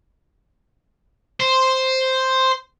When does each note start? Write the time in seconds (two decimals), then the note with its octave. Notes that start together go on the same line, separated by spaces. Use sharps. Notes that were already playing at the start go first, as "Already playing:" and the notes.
1.40 C5